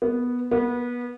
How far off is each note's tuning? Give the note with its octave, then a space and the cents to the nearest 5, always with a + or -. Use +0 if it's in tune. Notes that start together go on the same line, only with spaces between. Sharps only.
B3 -5
B3 -25